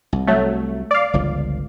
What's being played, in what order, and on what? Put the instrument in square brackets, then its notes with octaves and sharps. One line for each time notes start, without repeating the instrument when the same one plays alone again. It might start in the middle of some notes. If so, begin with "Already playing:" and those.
[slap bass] C2
[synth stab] F#3 A3
D5 F5
[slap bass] G1 C#2 F3